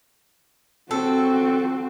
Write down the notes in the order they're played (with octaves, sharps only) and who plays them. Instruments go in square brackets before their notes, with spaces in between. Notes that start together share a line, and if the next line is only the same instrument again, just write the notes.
[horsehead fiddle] C4 F#4 [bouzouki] A4